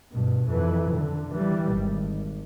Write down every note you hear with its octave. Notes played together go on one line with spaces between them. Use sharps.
G2 B2
F2 E3
D3
E3 G3
G#1